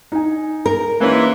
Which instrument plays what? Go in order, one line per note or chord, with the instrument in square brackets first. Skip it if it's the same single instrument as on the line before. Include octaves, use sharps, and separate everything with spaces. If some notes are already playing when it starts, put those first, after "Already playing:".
[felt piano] D#4 G#5
[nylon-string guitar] A#4
[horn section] G#2 E3 [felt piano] A#3 C#4